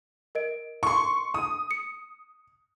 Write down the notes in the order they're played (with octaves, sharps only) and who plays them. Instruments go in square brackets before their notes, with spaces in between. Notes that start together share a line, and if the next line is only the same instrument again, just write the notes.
[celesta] A#4 D#5 D7
[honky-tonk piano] C6 C#6
D#6
[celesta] C#7